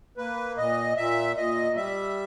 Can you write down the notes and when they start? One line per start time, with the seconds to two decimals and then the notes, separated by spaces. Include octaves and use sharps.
0.17 A#3 B4
0.57 A#2 D#5
0.97 A#2 E5
1.37 A#2 D#5
1.76 G3 E5